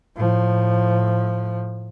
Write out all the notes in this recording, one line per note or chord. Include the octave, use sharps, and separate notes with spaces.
A2 F3